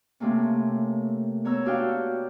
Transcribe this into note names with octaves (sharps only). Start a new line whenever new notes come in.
C3 A3 A#3 C#4
B3 C#5 A#5 E6
D4 F#4 G4 F5 G5